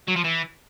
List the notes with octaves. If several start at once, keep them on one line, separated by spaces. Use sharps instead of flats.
F#3
F3
E3